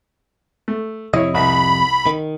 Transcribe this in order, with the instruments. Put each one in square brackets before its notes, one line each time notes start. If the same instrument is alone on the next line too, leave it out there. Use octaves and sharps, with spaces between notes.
[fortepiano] A3
[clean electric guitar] F2 C3 D#5 [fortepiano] E4 C#5
[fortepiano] C2 [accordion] B5
[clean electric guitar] D#3